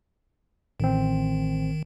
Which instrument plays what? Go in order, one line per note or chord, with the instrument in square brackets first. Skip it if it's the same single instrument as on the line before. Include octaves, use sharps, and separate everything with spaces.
[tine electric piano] A1 C4 [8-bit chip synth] D#3